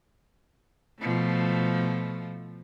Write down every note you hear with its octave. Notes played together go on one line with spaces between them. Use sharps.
B2 F3 A3